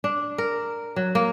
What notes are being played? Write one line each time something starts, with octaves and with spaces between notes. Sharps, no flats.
D4
A#4
F#3
A#3